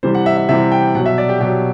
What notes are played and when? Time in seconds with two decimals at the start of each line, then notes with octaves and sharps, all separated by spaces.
0.03 C3 E3 G3 C5
0.15 F#5
0.26 E5
0.37 E5
0.49 C3 E3 G3 E5
0.72 G5
0.95 B2 F#3 F#5
1.06 E5
1.18 D5
1.29 G4
1.40 B2 F#3 G4